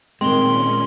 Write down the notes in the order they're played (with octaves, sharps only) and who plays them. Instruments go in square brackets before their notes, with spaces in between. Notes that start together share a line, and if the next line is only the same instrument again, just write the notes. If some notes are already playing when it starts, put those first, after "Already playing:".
[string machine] A#2 C#4 [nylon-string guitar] D#3 C4 [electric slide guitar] G#3 [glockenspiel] C6 G7